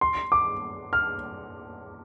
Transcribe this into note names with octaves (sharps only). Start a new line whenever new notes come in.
C6
D6
F6